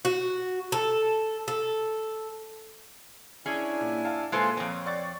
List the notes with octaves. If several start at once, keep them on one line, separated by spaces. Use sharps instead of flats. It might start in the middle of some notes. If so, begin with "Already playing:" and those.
F#4
A4
A4
C#4 D4 E4 G#4 G#5
A#2
F5 A5
A#2 G#3 F4 G#4 A4 B4 C5 E5
F2 C4 C#5
D5 C#6 A6